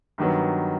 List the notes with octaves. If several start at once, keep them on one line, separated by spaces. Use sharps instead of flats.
G2 D#3 F#3 B3